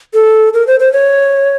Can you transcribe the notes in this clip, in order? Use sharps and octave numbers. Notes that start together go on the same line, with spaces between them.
A4
A#4
C5
C5
C#5